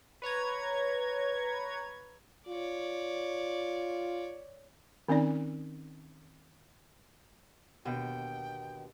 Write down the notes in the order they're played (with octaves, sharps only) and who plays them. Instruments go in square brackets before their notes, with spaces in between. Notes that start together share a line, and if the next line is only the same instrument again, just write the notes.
[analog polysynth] B4 C#5 A#5 G#6
[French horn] F4 [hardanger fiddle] C#5 D5
[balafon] D#3 C4 C#4 D#4 D5
[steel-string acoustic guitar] D#2 B2 D3 [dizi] G5